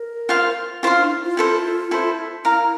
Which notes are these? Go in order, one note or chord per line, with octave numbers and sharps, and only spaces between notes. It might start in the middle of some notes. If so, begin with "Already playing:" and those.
Already playing: A#4
F4 C5 F5 C6
E4 F4 C5 F5 C6
D4
E4
F4
E4 A4 C5
E4 A4 C5
E4 A#4 F5 A#5